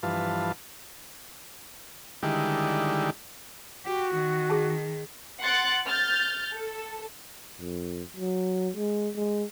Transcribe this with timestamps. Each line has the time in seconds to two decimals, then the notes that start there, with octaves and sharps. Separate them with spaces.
0.03 G2 E3 F3 B4 F5 A5
2.23 D3 D#3 G3 G#3 E4 G4
3.85 F#4 G4
4.16 D#3
4.50 G#4 A5
5.42 F#5 C6 F#6 A6 C#7 D7
5.87 F6 G6 A6
6.53 A4
7.60 F2
8.16 F#3
8.76 G#3
9.16 G#3